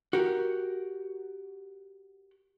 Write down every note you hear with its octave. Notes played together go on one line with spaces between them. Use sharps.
F#4 G4 A#4